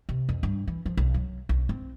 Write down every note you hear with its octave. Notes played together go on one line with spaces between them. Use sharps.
C3
F2
G2
E3
F3
B1
F#3
B1
C4